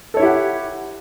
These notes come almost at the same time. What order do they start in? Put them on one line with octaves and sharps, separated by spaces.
A4 C#5 E4 G4 F#5